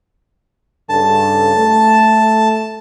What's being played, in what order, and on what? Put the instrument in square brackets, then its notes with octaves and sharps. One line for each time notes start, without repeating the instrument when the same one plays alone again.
[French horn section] G2 C#3 A4 [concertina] A5
[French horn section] A3